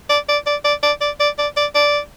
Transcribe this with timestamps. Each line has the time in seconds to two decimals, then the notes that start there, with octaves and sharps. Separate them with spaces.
0.10 D5
0.29 D5
0.47 D5
0.65 D5
0.83 D5
1.01 D5
1.20 D5
1.38 D5
1.57 D5
1.75 D5